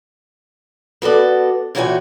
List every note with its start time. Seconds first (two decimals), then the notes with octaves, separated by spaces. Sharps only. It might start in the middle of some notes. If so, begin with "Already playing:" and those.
1.02 B3 F#4 A4 D5
1.75 A#2 E3 F#4 C#5 G5 G#5